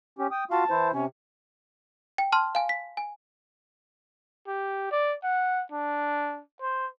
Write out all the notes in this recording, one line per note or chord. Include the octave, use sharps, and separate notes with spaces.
C#4 G4
G5 D#6
F4 F#4 F5 A5
E3 E4 C5
C3 C#4
G5
A5 C6 F6
F5 G#5
B6
G#5
G4
D5
F#5
D4
C5